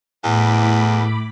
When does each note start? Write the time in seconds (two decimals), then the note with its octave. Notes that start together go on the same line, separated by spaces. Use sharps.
0.24 E2 A2 B5 D6